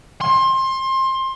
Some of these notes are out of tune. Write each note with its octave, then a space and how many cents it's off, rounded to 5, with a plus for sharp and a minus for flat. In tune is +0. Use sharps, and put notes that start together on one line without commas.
C6 +25